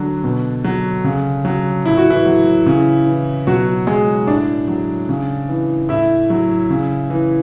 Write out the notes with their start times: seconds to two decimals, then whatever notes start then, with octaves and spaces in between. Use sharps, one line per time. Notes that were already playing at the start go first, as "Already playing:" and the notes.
Already playing: D3 F#3 D4
0.24 B2
0.64 F#3
1.04 C#3
1.45 F#3
1.86 A2 E4
1.97 F#4
2.10 E3 E4
2.26 F#3
2.66 C#3
3.07 E3
3.47 B2 F#3 F#4
3.87 F#3 G#3 G#4
4.27 A2 D4 D5
4.68 F#3
5.09 C#3
5.49 E3
5.89 A2 E4 E5
6.30 F#3
6.70 C#3
7.10 E3